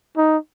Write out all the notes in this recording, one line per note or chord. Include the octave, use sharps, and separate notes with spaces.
D#4